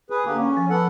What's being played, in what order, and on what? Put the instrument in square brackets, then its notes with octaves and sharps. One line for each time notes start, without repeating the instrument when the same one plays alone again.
[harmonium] G#4 B4
D3 A#3 G4
C#4
[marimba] F3
[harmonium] B3 A4 F#5